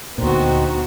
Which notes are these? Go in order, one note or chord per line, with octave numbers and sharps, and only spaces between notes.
D2 A#2 B3 C4 D#4 F#4 C5